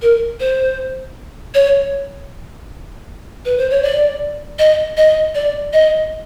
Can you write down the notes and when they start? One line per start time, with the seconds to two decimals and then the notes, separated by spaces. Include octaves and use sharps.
0.02 A#4
0.40 C5
1.54 C#5
3.45 B4
3.58 C5
3.70 C#5
3.83 D5
4.59 D#5
4.97 D#5
5.35 D5
5.73 D#5